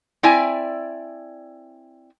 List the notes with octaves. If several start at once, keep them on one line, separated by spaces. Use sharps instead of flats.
C4 E4 D5 E5 G#5